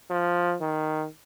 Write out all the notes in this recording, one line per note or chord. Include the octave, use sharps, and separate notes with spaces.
F3
D#3